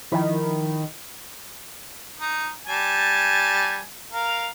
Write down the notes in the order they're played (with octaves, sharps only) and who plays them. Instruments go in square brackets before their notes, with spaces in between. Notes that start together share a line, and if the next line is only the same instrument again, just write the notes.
[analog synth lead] D#3 [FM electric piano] F3 E4 B5
[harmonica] D#4
G3 G#5 A5
A#4 F5